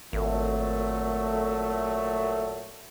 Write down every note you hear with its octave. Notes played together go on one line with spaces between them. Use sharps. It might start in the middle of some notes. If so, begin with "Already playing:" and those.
G#1 A#2 F#3 A3